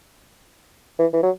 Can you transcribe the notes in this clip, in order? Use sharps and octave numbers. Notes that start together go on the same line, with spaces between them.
E3
E3
F#3